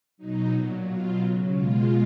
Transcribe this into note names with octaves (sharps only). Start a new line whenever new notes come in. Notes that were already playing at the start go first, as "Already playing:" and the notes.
B2 F#3 D#4
A#2 F#3
B2 F#3 F4
C#3 F#3
B2 G#3 F4